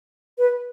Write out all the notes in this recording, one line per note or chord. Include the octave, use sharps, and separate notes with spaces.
B4